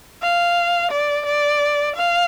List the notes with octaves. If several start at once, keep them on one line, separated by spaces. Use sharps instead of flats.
F5
D5
D5
F5